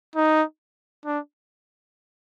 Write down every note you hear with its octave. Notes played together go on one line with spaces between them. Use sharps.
D#4
D4